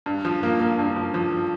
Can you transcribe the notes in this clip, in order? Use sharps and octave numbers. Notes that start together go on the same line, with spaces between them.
G2
F3
A#3
A#3
G2
F3
F3